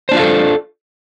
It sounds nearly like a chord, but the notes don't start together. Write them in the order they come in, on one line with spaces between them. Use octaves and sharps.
C5 D4 F4 F5 A4